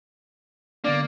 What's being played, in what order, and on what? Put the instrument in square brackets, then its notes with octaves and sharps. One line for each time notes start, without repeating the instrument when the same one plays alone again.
[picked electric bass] D3 B3 D4 [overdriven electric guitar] A#3 [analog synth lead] D5